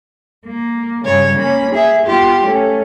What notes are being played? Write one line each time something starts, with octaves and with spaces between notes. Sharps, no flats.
A#3
G2 C#3 C#5
A#3 C#4 B5
G#4 E5
B3 F4 G4
A3 C#4